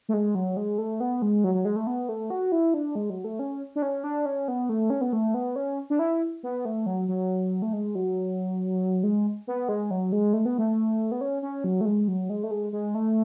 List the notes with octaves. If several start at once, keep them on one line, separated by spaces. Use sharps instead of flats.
A3
G#3
F#3
G#3
A3
B3
G#3
F#3
F#3
G#3
A3
B3
A3
F#4
E4
D4
G#3
F#3
A3
C#4
D4
C#4
D4
C#4
B3
A3
C#4
B3
A3
B3
C#4
D4
E4
B3
A3
F#3
F#3
A3
G#3
F#3
G#3
B3
G#3
F#3
G#3
A3
B3
A3
B3
C#4
C#4
F#3
A3
G#3
F#3
G#3
A3
G#3
G#3
A3